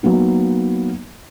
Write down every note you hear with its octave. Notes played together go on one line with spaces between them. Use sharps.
F#3 A#3 B3 D#4